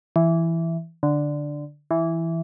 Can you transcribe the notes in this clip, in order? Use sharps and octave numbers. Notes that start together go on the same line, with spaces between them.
E3
D3
E3